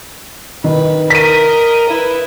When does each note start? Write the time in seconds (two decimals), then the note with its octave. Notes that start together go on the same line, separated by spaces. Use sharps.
0.64 D#3 B4
1.10 A#4 D#5 B6 D#7
1.89 E4 B4